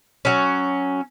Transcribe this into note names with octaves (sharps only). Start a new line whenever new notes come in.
F#3 C#4